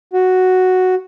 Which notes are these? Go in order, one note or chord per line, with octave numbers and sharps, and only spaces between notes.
F#4